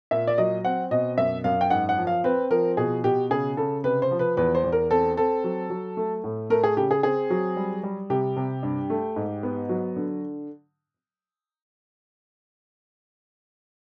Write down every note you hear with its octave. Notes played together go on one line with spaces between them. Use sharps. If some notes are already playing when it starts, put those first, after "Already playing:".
A#2 E5
D5
F#3 D#5
C4 F#5
B2 D#5
F#2 E5
F#2 F5
G5
G#2 F#5
F#5
F3
F5
C4 B4
F3 A#4
B2 G#4
B2 G4
C#3 G#4
C#3 A4
C3 B4
C5
F3
B4
E2 B4
C5
E2
A#4
C4 A4
C4 A4
F#3
F#3
A3
A2
A3 A#4
G#4
C#3 G4
G#4
C4 G#4
F#3
G3
G3
C3 G4
C3
G2
A3
G#2
B3
F#3
D3